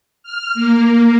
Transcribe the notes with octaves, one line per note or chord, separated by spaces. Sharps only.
F6
A#3